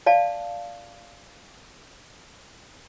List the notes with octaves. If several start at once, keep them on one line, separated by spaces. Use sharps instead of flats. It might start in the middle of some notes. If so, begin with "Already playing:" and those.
D5 F5 A5